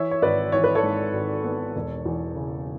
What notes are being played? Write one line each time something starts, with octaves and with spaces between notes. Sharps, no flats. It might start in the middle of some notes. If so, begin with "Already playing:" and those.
Already playing: E3 C#5 E5
C#5
G#1 B4 D5
E3 C#5
B4
A4 C#5
G#2
G#1
B3
E1
E2
C#3